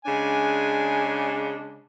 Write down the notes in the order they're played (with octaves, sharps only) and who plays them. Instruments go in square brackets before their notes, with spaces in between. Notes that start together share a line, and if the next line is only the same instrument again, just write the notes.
[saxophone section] C#3 G#3 D4 [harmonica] G#5